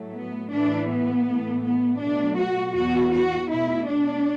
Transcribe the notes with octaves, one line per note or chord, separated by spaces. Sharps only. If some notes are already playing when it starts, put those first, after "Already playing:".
Already playing: A2 F#3 A3
B3
A2 E3 A3 D4
B3
A2 E3 A3
B3
B2 F#3 A3 D4
F#4
E2 E3 B3 F#4
F#4
B2 A3 E4
D4